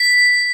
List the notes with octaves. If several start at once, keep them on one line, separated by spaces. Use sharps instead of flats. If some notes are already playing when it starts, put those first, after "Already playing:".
Already playing: B6